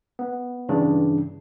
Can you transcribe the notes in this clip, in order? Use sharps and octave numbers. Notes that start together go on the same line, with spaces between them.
B3
G2 C#3 E3 D4